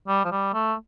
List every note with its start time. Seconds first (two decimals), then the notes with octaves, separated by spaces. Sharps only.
0.08 G3
0.24 F3
0.31 G3
0.53 A3